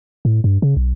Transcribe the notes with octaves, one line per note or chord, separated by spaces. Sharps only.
A2
G2
C#3
B1